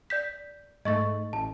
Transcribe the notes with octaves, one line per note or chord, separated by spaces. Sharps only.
D5 G6 B6
G#2 A3 D#5 C#6 A6
A1 A5